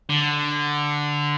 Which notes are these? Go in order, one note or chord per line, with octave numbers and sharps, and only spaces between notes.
D3